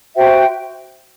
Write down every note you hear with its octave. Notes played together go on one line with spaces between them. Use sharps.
F#4 C5 E5 G5